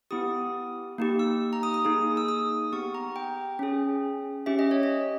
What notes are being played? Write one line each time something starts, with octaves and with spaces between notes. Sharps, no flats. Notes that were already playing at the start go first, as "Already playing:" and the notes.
B3 E4 G4 D#6
A#3 D#4 G4
E6
A#5
D#6
D#6
A#3 D#4 G#4
E6
D#6
B3 G4 C#6
A#5
G5
C#4 G#4
C#4 G4 E5
D#5
C#5
D#5